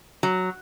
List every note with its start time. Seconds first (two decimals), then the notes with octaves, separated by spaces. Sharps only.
0.23 F#3